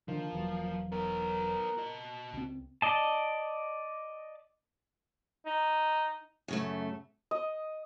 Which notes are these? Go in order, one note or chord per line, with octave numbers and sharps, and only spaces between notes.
D3 D#3 F3 A#3
E1 E3 F#3
B3 A#4 C#5
F#4 D#5
C#2 C4
D5 D#5 A5
D#4
F#2 C#3 A3
D#5